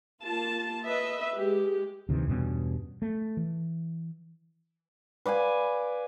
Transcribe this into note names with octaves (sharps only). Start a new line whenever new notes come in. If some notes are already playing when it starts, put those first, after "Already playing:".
A#3 F4 A5
B4 D#5 E5
G#3 G4
D2 C3 D#3 E3
E2 G2 B2 C#4
A3
E3
B4 D5 F5 G#5